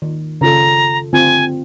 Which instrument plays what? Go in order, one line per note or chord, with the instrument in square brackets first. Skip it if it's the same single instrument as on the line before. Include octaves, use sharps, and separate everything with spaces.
[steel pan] D#3
[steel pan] C#3 F4 A4 [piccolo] A#5
[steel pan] D3 C4 F4 [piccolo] G#5